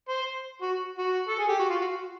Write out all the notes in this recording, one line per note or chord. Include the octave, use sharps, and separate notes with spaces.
C5
F#4
F#4
A4
G#4
G4
F#4
F4
F#4